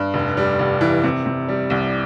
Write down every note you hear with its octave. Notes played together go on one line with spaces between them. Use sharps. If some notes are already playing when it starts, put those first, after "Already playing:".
Already playing: G2
F1
G3
F1
E3
C3
C3
G3
C2